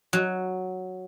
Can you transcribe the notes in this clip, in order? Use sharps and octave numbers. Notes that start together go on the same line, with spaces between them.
F#3